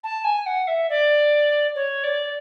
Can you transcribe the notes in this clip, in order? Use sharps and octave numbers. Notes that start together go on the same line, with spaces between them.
A5
G#5
F#5
E5
D5
C#5
D5